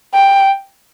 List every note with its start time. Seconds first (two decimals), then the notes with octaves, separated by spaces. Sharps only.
0.14 G5